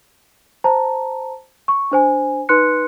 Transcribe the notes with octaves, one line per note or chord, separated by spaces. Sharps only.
C5 A5 A#5
C#6
D4 C5 G#5
D#4 B4 C6 F#6 C#7